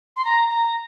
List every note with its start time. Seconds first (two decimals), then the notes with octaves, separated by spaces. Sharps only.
0.16 C6
0.24 A#5
0.49 A#5